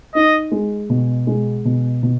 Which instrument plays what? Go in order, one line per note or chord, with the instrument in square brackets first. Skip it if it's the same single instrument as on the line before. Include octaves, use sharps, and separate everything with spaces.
[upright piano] D#4 [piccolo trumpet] D#5
[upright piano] G#3
B2
G#3
B2
B2